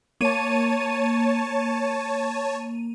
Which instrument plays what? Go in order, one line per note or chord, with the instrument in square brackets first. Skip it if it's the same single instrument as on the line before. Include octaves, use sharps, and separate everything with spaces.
[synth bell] A#3 D#7 [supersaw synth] C#5 A5